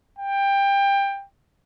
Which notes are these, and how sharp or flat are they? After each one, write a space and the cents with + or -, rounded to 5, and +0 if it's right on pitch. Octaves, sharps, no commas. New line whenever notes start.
G5 +20